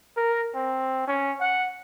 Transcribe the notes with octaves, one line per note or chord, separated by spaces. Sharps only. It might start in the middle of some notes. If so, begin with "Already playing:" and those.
A#4
C4
C#4
F#5